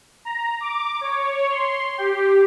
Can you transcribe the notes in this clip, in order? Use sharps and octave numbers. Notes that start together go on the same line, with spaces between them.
A#5
D6
C#5
C6
G4